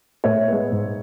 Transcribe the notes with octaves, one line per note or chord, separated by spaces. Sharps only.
A2 C#5 E5
G#3 B3
G#2